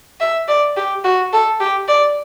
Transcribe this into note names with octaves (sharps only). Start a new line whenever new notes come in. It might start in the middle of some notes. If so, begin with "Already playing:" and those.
E5
D5
G4
F#4
A4
G4
D5